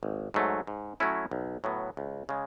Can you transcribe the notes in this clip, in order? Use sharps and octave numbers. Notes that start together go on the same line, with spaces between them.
G#1
G#2 F#3 A3
G#2
F#3 A3 C#4 E4
B1
A2 F#3 B3
C#2
C#3 G#3